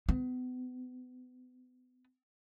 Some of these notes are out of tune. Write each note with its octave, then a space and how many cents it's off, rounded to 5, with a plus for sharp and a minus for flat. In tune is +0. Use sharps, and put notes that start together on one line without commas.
B3 +35